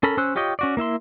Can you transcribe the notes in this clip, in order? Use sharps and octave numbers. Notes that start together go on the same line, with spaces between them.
C#4 A4 A#4 B5
C#4 C5 C6 E6 F#6
F4 G4 C#5 D#5 G5
C#4 F#4 D5
A#3 E4 E5 C6